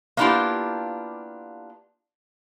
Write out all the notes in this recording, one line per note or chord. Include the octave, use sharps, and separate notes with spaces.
A#3 B3 D4 E4 F4 G4